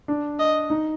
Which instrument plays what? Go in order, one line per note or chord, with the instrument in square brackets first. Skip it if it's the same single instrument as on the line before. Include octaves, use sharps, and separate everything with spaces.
[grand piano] D4
[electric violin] D#5
[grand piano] D#4